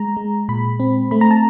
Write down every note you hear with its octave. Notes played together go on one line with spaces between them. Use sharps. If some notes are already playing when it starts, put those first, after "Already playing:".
Already playing: G#3 A#5
G#3
A#2 B5
C4
A3 B5
A#5
A5